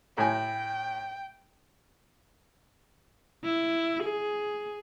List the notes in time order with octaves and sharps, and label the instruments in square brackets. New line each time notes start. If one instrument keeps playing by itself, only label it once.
[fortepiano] A2 G#5 [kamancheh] G5
[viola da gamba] E4
G#4